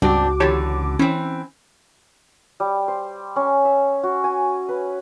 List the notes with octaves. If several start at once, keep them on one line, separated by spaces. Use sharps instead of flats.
C#2 G2 C4 D4 F#4 D6
D3 E3 G4 C#5 A5
E3 C4 C#4
G3
C5
C#4
E5
F#4
G#5
B4